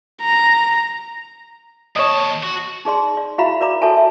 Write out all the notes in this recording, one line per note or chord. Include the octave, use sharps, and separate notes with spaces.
A#5
D#2 C#5 D#5 A5
F#4
D#4 G#4 D5 C6
D5
E4 F#4 E5 F5 A#5 B5
A#4 D5 A#5 D6
F#4 A4 C#5 E5 G#5 A5
E5